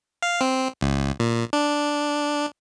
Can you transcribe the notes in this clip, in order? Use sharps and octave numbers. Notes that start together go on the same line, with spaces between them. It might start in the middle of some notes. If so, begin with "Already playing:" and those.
F5
C4
C#2
A#2
D4